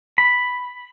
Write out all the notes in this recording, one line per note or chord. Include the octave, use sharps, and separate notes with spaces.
B5